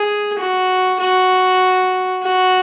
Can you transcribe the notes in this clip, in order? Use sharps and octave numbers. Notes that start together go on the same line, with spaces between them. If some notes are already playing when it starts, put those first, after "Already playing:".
Already playing: G#4
F#4
F#4
F#4